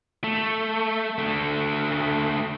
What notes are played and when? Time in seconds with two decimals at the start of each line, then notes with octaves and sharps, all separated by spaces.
0.24 A3
1.18 D3 A3